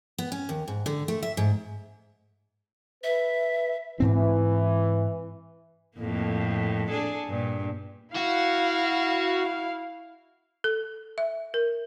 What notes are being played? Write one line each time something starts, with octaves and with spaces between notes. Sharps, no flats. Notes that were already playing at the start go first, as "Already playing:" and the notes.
B3
C#4
D#2
G#2
D3
A3
E5
G#2
B4 E5
G#2 E3 C4
F2 A2 A#3
D4 G#4 A4
G2 A#2
E4 F#4 F5
A4
E5
A#4